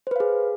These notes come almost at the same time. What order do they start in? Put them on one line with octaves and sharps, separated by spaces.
C5 B4 F5 G#4